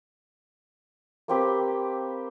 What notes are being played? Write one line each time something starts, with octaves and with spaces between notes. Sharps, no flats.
A#3 C4 G4 B4